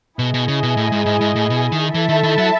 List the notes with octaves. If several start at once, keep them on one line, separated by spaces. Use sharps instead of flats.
B2 E4 G#4 D#5 G#5
B2
C#3
B2
A2
G#2
G#2
G#2
A2
B2
D#3
E3 E4 A4 E5 A5
D#3
D#3
F#3